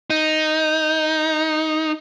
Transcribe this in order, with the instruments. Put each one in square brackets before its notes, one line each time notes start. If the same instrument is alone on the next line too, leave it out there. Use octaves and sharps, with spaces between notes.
[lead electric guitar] D#4